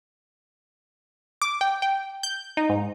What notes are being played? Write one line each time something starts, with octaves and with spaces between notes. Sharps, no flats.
D6
G5
G5
G6
D#4
G#2